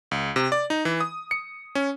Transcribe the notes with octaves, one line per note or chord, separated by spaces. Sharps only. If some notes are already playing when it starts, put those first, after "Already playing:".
C#2
C3
D5
D#4
E3
D#6
C#7
C#4